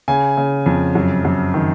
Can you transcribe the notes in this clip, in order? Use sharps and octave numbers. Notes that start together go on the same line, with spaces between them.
C#3 G#5
C#3
F2
F#2
F#2
D#3